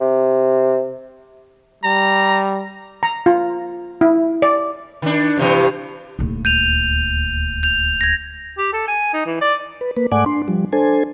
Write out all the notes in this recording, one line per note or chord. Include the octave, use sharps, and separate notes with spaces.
C3
G3 A#5
A#5
F4
E4
D5
D#3 D4
G2 C3 E3
D#1 D2
G6 D#7 F7
G6 F7
G#6 A#6
G4
A4
G#5
D#4
E3
D5
B4
A#3 B4
G#2 A3 D5 F#5 G#5 D6
D4 C6
F3 G3
D4 A4 C5 G#5